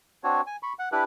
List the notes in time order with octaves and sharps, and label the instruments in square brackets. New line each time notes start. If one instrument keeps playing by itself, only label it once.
[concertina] C4 D4 F#4 C#5
G#5
B5 C#6
F#5
D4 E4 G4 B4